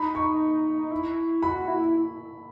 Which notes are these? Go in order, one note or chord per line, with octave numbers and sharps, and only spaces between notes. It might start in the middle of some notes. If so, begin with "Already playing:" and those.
Already playing: D#4 B5
C#6
E4
F#4 B5
E4